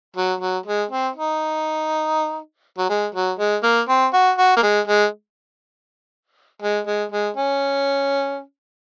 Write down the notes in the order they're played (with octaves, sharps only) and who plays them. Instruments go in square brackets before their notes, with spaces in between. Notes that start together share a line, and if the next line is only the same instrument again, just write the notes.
[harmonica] F#3
F#3
G#3
C4
D#4
F#3
G#3
F#3
G#3
A#3
C4
F#4
F#4
A#3
G#3
G#3
G#3
G#3
G#3
C#4